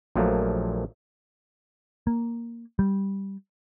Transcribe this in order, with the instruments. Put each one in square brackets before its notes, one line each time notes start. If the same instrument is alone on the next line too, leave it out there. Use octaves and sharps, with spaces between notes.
[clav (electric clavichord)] A#1 A#2 F3 F#3 A3 A#3
[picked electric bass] A#3
G3